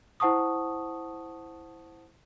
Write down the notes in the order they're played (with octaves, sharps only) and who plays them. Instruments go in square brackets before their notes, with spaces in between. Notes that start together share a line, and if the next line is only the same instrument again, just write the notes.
[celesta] E4 C5 F#5 A5 C#6 D#6